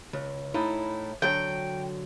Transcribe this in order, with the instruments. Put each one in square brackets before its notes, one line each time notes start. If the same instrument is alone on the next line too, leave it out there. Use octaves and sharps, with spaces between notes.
[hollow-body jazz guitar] C#2
A2 D#4 E4
[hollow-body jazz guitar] D3 F#3 [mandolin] G5